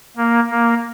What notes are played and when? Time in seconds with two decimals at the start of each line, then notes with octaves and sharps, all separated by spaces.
0.17 A#3
0.51 A#3